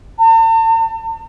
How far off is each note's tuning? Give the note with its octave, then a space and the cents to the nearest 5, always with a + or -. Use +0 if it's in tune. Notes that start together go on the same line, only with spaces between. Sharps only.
A5 +45